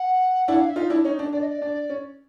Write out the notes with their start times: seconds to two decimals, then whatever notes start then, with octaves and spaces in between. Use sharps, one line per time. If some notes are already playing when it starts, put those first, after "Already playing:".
Already playing: F#5
0.47 D4 E4 F#5
0.58 F5
0.67 E5
0.76 D#4 F4
0.90 D4 E4
1.05 C#4 D#4
1.19 D4
1.33 D4 D5
1.40 D#5
1.48 D5
1.62 D4
1.90 C#4